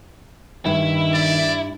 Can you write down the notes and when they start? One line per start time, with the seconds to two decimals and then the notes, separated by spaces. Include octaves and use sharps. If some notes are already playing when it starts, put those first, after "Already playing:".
0.66 G2 D#3 E4 E5
1.14 D5